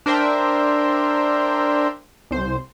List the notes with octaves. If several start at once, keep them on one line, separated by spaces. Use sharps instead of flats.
D4 A#4 C5 E5 G5
C2 C5